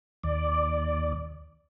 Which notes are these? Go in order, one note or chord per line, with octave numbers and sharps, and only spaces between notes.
D#2 D5